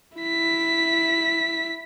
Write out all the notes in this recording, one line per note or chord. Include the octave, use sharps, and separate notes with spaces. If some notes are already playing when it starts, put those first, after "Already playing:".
E4 B6